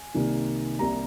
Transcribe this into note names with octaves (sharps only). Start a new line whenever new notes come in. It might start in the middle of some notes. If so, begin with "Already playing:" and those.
Already playing: G#5
C2 C3 D#3 A#3
C2 C3 G3 A#3 A#5